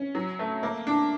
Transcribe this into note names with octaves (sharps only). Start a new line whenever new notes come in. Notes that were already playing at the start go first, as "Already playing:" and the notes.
Already playing: C#4
F#3
A3
A#3
D4